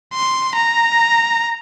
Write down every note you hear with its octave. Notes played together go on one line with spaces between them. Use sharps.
C6
A#5